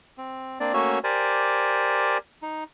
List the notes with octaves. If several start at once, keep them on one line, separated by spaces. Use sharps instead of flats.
C4
A#3 C4 D4 D5
A3 A#3 C#4 F#4 C#5 E5
G4 A#4 C5 D5 G#5
D#4